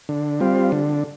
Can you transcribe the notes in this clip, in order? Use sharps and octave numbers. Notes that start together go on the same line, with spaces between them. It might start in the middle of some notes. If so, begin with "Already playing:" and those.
D3
G3 C4 F4
D3